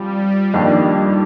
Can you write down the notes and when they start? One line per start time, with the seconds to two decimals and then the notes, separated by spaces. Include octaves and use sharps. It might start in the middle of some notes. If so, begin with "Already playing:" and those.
Already playing: F3 G3 C4
0.54 F2 D#3 A#3 D4 G4